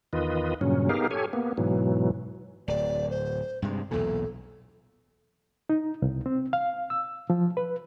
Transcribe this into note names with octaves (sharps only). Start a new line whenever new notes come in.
E2 D#3 F4 B4 D#5
G2 A#2 C#3 F#3 C#4
B3 D#4 G4 G#4 A#4 F5
G4 A4 C#5 G#5
A#3 B3
G#2 B2 E3 F#3
D1 D5
C5
G2 C3 G#3
B1 E2 A#2 A4
D#4
C2
C4
F5
E6
F3
B4